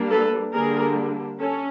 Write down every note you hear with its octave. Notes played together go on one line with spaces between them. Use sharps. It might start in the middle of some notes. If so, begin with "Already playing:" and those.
Already playing: G3 A#3 D4
A4 B4
D3 G3 A#3 D4 G#4 A#4
C#4 A4